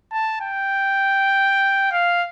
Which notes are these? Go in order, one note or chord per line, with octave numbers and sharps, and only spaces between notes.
A5
G5
F5